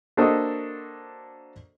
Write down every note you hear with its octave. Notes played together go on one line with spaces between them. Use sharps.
A#3 D4 F#4 A4 C5 D#5